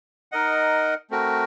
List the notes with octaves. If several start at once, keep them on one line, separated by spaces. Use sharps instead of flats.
D#4 A#4 D#5 F#5
A3 C4 F#4 A#4